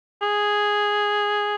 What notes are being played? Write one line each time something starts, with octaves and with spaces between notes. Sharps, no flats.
G#4